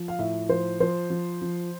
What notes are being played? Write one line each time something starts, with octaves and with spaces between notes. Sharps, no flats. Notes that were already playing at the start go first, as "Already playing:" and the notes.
Already playing: F3
F5
A2 E5
F3 C5
F3 C5
F3
F3